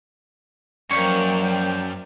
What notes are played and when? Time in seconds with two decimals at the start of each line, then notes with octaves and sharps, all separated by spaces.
0.91 F#2 F3 F#3 A#3 C#5 D5 G5